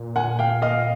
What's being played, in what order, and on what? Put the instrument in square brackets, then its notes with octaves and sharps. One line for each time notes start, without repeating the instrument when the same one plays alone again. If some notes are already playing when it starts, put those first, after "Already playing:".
Already playing: [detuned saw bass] A#2
[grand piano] F#5 G#5
F5 G5
D#5 F5